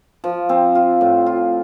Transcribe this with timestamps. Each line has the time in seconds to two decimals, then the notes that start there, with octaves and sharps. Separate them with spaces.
0.24 F3
0.49 C4
0.75 F4
1.01 A2
1.26 F4